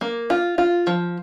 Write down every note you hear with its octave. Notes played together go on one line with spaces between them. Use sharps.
A#3
F4
F4
F3